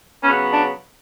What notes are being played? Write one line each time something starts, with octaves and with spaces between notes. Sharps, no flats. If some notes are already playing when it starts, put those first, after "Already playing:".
C#3 F#3 B3 C#4
D4